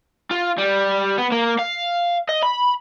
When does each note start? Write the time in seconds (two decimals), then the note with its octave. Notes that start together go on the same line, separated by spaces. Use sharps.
0.31 F4
0.58 G3
1.18 B3
1.32 A#3
1.59 F5
2.29 D#5
2.43 B5